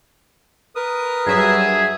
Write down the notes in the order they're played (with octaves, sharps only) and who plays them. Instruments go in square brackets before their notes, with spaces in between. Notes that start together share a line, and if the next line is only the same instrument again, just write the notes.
[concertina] A#4 B4 D#6
[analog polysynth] G2 F#3 E5 [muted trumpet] G#4